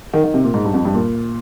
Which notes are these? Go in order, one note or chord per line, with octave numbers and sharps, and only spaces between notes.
D#3
D#3
C3
A#2
G#2
G2
F2
G2
A#2